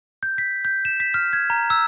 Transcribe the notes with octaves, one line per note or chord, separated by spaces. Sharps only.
G6
B6
G6
E7
B6
F6
G#6
A#5
E6